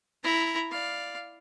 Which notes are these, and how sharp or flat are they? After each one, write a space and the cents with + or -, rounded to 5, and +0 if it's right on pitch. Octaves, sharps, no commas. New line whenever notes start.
E4 +0 A#5 +0
D5 +0 F5 +0